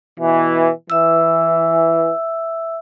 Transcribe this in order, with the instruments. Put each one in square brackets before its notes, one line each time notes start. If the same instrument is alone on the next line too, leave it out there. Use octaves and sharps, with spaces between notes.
[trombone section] B2 E3
[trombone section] E3 [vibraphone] E5 E6